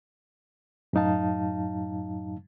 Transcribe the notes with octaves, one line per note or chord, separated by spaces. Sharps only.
F#2 A2 F#3 D#4 F5 A5